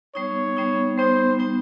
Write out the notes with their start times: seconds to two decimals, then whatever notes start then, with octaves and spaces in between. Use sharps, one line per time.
0.15 G3 B3 D#4 C#5
0.57 G3 B3 D#4
0.98 G3 B3 D#4 C5
1.39 G3 B3 D#4